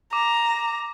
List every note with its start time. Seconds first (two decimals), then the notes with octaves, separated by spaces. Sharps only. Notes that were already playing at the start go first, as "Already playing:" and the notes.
0.13 A#5 D6